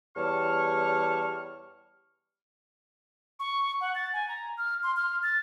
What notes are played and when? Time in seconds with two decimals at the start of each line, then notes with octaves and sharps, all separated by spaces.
0.16 E2 G3 C#5 A5 C#6 F6
3.40 C#6
3.81 F#5
3.95 A6
4.13 G#5
4.29 A#5
4.58 F6
4.83 C6
4.97 F6
5.23 A6